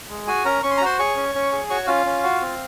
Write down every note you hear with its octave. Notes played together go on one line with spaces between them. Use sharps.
G#3
F#4 G#4 G#5
C#4 A#4 A#5
C#4 C#6
C6
A#5
F#4 C5 C6
G#4 C#5 C#6
C#4
C#4
G#4
F#4 C#5 C#6
C#4 F4 F5
C#4
F#4
C4